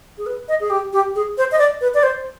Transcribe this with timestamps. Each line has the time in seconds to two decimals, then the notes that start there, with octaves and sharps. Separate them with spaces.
0.18 G#4
0.26 B4
0.48 D#5
0.60 G#4
0.70 G4
0.93 G4
1.15 G#4
1.38 C5
1.52 D#5
1.59 D5
1.81 B4
1.94 D5
2.03 C5